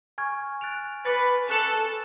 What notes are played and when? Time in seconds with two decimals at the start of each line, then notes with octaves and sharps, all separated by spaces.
0.18 G#5 C#6 F6 G#6
0.61 F#6 A6 D7 F7
1.05 B4 D6 F#6 A6 C#7
1.49 A4 A5 C#6 F#6 C#7 F#7